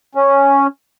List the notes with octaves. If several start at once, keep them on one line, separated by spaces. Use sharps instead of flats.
C#4